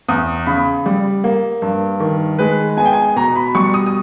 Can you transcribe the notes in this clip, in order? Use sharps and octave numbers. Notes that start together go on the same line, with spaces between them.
E2 D#6
C#3 B5
G3
A#3
G2
D#3
G#3 B4
B3 G#5
G5
G#5
B2 A#5
B5
G3 C#6
D#6
D#6